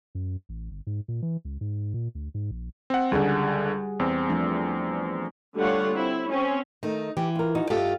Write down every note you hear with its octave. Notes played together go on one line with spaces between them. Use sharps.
F#2
A1
G1
G#2
A#2
E3
C#2
G#2
A#2
D2
G#2
A#1
C4 F#5
C#2 D3 G3 G#4 F#5
E2 C4
F3 A3 D4
D3 G3 A3 F4 C#5 F#5
C4 E4
C4 C#4
D#3 A3 D#4
E3 G4
F4 A#4
D#4 F4 F#4
G2 F4 G4 A4 D#5 E5